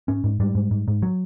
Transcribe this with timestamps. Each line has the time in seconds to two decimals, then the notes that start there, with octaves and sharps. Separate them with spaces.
0.08 G#2 C#4
0.24 G#2
0.40 G#2 G3
0.55 G#2
0.71 G#2
0.88 G#2
1.02 F#3